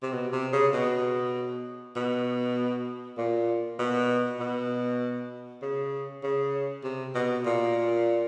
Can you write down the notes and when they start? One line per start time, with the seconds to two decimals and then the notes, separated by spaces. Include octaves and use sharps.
0.03 C3
0.12 B2
0.33 C3
0.53 C#3
0.74 B2
1.96 B2
3.18 A#2
3.79 B2
4.40 B2
5.62 C#3
6.23 C#3
6.84 C3
7.15 B2
7.46 A#2